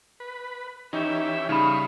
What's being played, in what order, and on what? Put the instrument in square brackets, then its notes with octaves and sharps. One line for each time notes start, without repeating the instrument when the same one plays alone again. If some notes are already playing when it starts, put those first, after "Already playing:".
[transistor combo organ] B4
[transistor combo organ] E3 C#4 G4 [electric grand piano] D#4 [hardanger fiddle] E5
[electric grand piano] C#3 G3 [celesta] D#4 B5 [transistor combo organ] F5 C#6 D#6